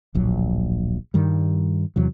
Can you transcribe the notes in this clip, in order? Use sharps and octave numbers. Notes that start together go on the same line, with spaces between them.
D1 A#1 F#3
G2 D#3 G3
E2 C3 F#3